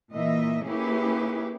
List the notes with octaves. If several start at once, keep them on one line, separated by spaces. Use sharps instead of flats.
A#2 E3 A#3 D#5 E5
A#3 C#4 E4 G4 G#4 B4